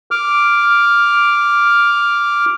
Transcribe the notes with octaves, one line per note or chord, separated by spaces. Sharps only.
D6 F6